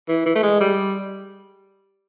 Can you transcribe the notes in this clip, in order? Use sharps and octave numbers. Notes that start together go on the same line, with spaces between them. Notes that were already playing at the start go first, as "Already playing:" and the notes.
E3
E3
A3
G#3
G3